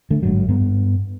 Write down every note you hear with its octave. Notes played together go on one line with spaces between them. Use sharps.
D3 A3
G1 G#2 F#3
G2 B3